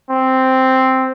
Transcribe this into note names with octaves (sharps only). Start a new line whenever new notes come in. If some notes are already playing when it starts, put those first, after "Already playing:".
C4